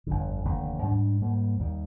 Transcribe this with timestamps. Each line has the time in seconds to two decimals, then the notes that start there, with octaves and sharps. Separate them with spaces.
0.07 G1 F2 D3
0.45 F1 D#2 D3
0.82 G#2 G3 D4
1.21 G#2 G3 A#3
1.59 D#2 D#3 G3